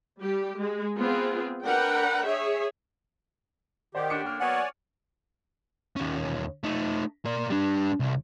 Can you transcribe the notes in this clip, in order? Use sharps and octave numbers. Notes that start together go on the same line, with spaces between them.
G3 G4
G#3
B3 C4 F4 G#4
D4 A#4 B4 F#5 G5
G#4 C#5 E5
D#3 G4 C5 D5 F#5
D3 C#4 D4 F#5 D6 C#7
A#3 G5 F6
F#3 A#3 B3 C#5 D5 F#5 G#5
D#2 C#4
A3 D#4
A#3 D5
G3 D4
C2